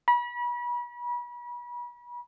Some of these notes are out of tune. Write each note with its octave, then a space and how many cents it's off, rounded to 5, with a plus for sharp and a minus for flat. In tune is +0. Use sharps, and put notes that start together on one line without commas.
B5 -35